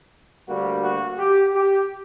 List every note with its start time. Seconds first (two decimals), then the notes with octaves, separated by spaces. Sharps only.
0.48 D2 D3 G3 A#3 F#4
0.83 F#4
1.18 G4
1.54 G4